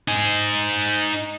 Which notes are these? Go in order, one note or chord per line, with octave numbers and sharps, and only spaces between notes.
D#4 G#5